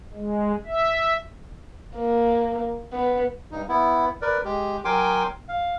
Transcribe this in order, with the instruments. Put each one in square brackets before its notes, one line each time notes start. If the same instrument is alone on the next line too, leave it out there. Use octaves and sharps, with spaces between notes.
[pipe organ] G#3
E5
[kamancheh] A#3
B3
[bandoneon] G2 D#4
B3 E4
A#4 B4 D5
G#3 G4
F#3 A#4 G5 G#5 C6 D6
F5